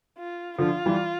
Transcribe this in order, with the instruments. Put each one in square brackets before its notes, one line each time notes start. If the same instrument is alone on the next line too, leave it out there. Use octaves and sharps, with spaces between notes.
[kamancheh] F4
[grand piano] D3 F3 [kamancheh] F4
[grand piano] E3 G3